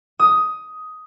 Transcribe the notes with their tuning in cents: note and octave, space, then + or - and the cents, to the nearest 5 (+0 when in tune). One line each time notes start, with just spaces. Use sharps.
D#6 +10